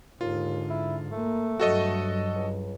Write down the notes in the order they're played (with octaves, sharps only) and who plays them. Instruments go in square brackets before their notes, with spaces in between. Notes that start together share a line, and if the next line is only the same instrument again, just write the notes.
[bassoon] D#2 [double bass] G#2 D3 [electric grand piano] F4
[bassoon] E4
[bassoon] A3 [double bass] A#3
[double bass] G2 F#3 [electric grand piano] F#4 A4 D#5
[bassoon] C#2